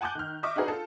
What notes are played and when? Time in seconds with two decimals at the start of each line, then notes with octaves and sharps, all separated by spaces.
0.01 F#5 G#5 A5 D6 F#6 G6
0.15 D#3 F6
0.43 D#5 E5 C#6 D6
0.56 D4 D#4 F#4 G#4 A#4 B4
0.68 F4 A4